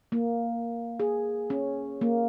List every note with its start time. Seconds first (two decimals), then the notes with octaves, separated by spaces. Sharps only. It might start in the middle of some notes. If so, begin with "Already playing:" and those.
0.12 A#3
1.00 G#4
1.50 C#4
2.01 A#3